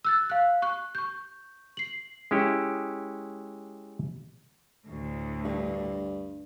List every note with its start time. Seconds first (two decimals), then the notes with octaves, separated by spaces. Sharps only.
0.05 E6 F#6 A6
0.30 F5 F#6
0.62 C#6 F#6
0.95 C#6 G6
1.77 C7 F#7
2.31 G#3 C#4 E4 G4
4.87 D2 A2
5.45 G2